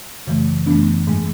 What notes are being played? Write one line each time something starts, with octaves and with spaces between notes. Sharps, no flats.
F#2 C#3 E3 A3
F#2 E3 A3 B3 D4
G#2 E3 G#3